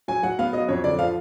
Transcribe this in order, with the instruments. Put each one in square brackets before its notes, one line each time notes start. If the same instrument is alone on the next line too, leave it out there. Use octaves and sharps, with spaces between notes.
[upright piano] F#3 G#5
F#3 F#5
B3 F5
F#3 D#5
F2 C#5
D3 D5
F3 F5